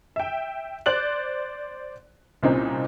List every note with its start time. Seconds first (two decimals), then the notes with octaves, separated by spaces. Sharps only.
0.16 E5 G5
0.86 C5 D5 F#6 F#7
2.43 C2 A#2 C4 C#4 D#4